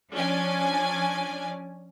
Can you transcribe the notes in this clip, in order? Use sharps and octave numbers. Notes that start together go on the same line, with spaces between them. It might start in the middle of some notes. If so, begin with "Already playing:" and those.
F3 C#4 D4 D5 G#5